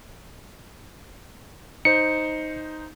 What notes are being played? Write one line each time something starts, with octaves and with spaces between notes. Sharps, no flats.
D#4 C5 C#7